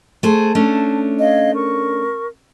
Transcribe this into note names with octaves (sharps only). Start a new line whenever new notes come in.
A3 G#4 C5 A5
A3 C#4 D4
C#5 D#5 F5
A#4 C#6